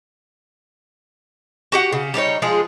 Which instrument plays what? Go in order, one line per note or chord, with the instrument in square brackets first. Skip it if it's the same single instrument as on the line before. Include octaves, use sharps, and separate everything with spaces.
[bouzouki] F#4 G4 F#5
C#3
G3 D4 D#4 C#5
F3 G#3 F4 G#4